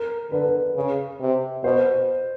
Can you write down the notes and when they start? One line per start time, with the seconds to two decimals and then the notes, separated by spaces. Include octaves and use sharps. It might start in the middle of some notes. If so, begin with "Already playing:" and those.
Already playing: A#4
0.31 D3 B4
0.46 B4
0.76 C#3
1.21 C3
1.64 B2 C5